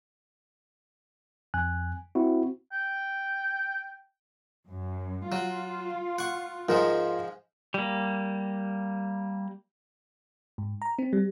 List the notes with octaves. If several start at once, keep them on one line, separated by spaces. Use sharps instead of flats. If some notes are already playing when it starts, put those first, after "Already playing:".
F2 G#5 F#6
C4 E4 F#4
G5
F#2
F#3 F4
F#5 C#6
G#2 F3 G#3 F4 A#4
G3 A#3
G#2
A#5
C4
G3